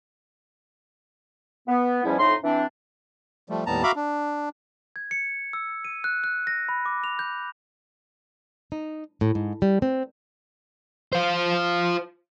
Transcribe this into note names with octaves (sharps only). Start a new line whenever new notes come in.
B3
E2 G#2 F3 G3 C#4 E4
F2 A2 D#4 C6
E3 C4 D4
F3 G3 A3
D#2 A2 G3 B3 A5 A#5
F#4 E5 F5 A#5 B5 D6
D4
G#6
C#7
E6
D#7
F#6
F#6
A#6
B5
D6
F7
G6
D#4
A2
G#2
G3
C4
F4 C5